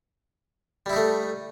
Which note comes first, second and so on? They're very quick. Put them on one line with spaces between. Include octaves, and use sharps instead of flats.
G3 E4 D#4 A3